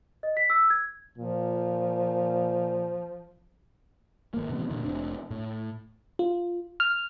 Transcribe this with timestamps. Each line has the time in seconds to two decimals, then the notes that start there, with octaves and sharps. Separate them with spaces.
0.23 D#5
0.37 B6
0.50 E6
0.70 G#6
1.18 A#2 F3
4.34 G#1 A#3
4.49 D#1 A1 C3 B3
4.70 D2 A#2 D3 D#3
4.84 F1 C4 D4
5.31 A2
6.19 F4
6.80 F6